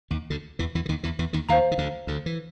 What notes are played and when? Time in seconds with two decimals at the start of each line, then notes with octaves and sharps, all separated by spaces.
0.11 D#2 D#3
0.30 D2 D3
0.59 E2 E3
0.75 E2 E3
0.86 D3
0.89 D#2 D#3
1.03 E2 E3
1.19 E2 E3
1.33 D#2 D#3
1.49 D#2 D#3 C5 F5 A#5
1.71 D#3
1.78 D2 D3
2.07 D2 D3
2.26 E3